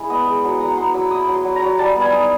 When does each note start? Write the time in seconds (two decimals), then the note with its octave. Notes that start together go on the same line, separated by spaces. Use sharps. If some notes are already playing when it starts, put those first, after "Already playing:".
Already playing: G#3 E4
0.10 B3 D#5
0.27 G#3
0.44 F#3
0.60 F#3 A#5
0.77 B3 C6
0.94 F#3 E6
1.11 E4 D#6
1.28 F#3
1.33 C6
1.45 F#3
1.56 A#5
1.62 F#3
1.78 G3 A5
1.96 B3
2.01 G#5
2.12 D#4